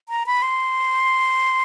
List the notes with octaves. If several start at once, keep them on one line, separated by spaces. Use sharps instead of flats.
A#5
B5
C6